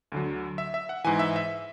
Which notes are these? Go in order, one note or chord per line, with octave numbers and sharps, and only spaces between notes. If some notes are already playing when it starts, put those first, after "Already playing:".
D2 D3 F#3
E5
E5
F#5
G#2 E3 G#5
E5
E5